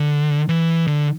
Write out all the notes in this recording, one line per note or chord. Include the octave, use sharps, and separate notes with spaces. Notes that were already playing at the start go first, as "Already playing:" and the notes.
Already playing: D3
E3
D3